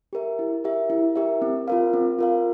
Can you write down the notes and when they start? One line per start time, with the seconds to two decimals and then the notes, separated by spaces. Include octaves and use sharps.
0.13 G4 A#4 E5
0.39 E4
0.64 G4 A#4 E5
0.90 E4
1.16 G4 A#4 E5
1.42 C4
1.68 F4 A#4 F5
1.93 C4
2.19 F4 A#4 F5